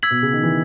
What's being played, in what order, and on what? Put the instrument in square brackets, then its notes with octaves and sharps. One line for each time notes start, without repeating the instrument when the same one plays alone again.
[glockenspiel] E6 G#6 B6 F#7
[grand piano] B2
C#3
D#3
E3